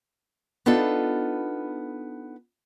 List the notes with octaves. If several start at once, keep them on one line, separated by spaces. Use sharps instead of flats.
B3 D4 D#4 F4 A4